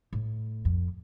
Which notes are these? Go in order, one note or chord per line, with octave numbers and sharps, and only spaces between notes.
A2
F2